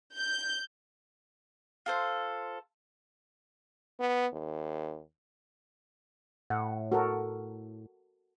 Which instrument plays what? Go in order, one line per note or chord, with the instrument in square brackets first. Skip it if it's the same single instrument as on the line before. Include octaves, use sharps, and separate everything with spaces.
[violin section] G6
[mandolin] F4 A4 C5
[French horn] B3
D#2
[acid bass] A2 [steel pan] F#5
[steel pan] F#4 A4 A#4